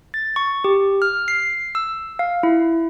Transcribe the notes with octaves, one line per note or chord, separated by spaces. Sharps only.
A6
C#6
G4
F6
C7
E6
F5
E4